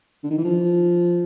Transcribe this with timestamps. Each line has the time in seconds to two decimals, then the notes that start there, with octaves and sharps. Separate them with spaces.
0.23 D3
0.30 D#3
0.37 E3
0.44 F3